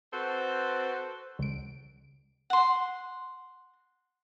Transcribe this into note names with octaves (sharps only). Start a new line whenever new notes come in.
C4 F#4 A4 B4 C5
C#2 D7
F#5 C6